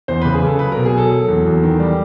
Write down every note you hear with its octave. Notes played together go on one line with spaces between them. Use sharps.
E2 C5
C#3 B4
G#4
C#3 A4
F#3 B4
B2 A#4
G#4
F#3 A4
F#3
E2
E2
D#3
G3